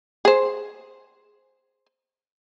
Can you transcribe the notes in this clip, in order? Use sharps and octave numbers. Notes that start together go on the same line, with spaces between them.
G#4 C5